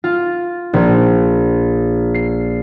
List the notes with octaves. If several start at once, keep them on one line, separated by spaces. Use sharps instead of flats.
F4
A#1
C7